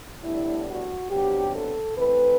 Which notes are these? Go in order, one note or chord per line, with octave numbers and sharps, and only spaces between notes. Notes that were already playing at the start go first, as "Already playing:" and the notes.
A2 G3 B3 D4 E4
F#4
C3 F#3 B3 D4 G4
A4
E3 A3 C4 B4